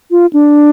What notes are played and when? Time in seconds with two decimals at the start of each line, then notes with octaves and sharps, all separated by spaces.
0.11 F4
0.33 D4